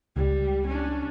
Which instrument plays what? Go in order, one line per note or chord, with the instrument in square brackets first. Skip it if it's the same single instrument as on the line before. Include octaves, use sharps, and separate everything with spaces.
[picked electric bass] C#2 [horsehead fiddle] G3
[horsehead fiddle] C#4 D4